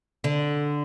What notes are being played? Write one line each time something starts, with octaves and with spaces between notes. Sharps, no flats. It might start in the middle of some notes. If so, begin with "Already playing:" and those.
D3